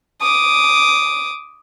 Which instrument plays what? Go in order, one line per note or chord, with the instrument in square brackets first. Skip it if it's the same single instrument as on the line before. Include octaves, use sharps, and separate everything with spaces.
[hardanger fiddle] D6 D#6